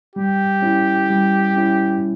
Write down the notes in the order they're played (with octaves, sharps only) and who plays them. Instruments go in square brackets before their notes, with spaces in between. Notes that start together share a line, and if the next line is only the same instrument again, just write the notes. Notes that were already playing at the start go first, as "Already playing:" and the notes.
[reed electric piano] G3 [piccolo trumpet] G4
[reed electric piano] C#4 E4
G3
C#4 E4